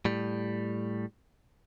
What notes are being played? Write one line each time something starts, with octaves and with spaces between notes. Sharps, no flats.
A2 G3